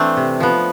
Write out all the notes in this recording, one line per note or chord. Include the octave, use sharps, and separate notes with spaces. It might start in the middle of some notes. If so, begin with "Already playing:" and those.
Already playing: E3 A3 C4 D4
C3
F3 B3